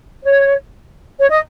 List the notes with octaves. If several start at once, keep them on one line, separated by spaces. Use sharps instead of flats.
C#5
C#5
D#5